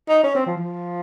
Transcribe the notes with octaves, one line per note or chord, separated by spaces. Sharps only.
D#4
C#4
C4
F3
F3